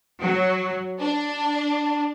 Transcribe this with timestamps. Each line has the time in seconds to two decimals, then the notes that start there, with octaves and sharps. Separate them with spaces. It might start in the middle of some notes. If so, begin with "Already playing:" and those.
0.20 F#3
1.00 D4